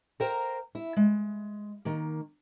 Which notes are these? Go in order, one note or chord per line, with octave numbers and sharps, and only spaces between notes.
A#4 C5 F5 G5 A#5
E4
G#3
D#3 A#3